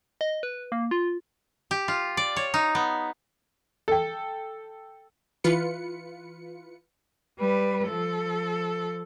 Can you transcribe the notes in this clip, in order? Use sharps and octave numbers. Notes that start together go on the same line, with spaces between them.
D#5
B4
A#3
F4
G4
F4
D5
C#5
D#4
B3
A4 G5
E3 F4 B4 C#7
G3 B4
F3 A4